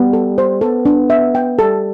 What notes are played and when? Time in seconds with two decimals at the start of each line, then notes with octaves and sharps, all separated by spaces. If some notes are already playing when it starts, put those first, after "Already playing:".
Already playing: G3 B3
0.13 A4
0.38 C5
0.61 B3 A4
0.86 D4
1.10 E5
1.35 G5
1.59 G3 A4